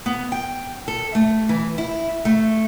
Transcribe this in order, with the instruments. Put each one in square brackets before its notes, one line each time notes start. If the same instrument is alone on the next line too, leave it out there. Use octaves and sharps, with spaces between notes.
[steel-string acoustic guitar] B3
G5
A4
A3
E3
E4
A3